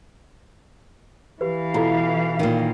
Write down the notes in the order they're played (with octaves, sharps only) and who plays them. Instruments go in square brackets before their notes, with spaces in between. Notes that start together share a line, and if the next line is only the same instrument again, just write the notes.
[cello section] E3 F5 [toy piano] G4 B4
[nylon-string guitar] B2 [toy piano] E4 F4 A4
[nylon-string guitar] A#2 D#3